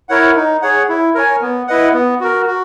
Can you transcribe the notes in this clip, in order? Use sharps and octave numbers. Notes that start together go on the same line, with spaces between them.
E4 A#4 C#5 F#5
D#4
G#4 C#5 F#5
E4
A#4 C#5 G#5
B3
E4 B4 D#5 F#5
B3
F#4 A#4
F#4